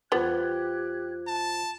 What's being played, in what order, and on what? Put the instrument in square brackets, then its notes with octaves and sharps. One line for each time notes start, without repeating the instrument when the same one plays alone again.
[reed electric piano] E2 F4 C5 [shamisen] G3 B3 [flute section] G4 F#6 G#6
[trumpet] A5